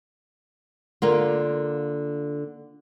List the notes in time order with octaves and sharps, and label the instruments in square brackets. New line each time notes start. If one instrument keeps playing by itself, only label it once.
[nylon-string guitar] D3 A#3 F4